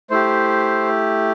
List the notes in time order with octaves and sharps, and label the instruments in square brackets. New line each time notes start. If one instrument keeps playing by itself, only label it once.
[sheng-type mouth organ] A3 E4 G4 C5